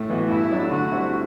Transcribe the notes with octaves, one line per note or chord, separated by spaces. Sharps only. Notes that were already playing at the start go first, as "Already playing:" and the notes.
Already playing: A2 A3
E3 B3 F#4
G2 E4
F#3 A3 D4
D3 F#4
G3 C4 E4